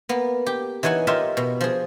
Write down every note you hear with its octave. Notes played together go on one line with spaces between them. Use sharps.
A#3 B3
G4
E3 D#4 C#5 F#5 G#5
F4 G4 A#4 C#5 D#5 E5
B2
F3 G#4